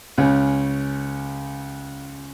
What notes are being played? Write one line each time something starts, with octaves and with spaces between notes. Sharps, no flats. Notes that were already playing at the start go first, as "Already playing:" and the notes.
C#2 C#3 C#4